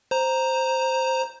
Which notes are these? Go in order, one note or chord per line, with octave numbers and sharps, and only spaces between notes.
C5 A#5